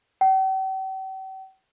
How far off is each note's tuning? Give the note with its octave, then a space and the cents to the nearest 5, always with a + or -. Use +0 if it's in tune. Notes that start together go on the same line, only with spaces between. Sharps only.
G5 -45